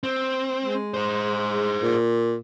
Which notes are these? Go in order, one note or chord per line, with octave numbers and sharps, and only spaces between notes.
C4
G#3
G#4 C5
A#2